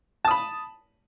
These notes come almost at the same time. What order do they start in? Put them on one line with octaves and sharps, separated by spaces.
A5 D#6 B5